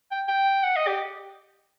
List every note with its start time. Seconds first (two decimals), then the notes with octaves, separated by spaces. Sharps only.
0.11 G5
0.28 G5
0.64 F#5
0.76 D#5
0.87 G4